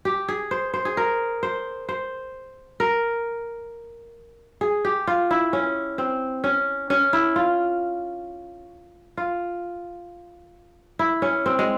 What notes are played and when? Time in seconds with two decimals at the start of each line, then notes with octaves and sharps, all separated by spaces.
0.05 G4
0.28 G#4
0.51 C5
0.74 C5
0.85 G#4
0.97 A#4
1.43 C5
1.89 C5
2.80 A#4
4.61 G#4
4.85 G4
5.07 F4
5.31 E4
5.53 C#4
5.98 C4
6.44 C#4
6.90 C#4
7.13 E4
7.36 F4
9.17 F4
10.99 E4
11.22 C#4
11.46 C4
11.59 G#3